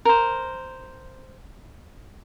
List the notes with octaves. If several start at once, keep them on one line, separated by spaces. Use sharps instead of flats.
A#4 C5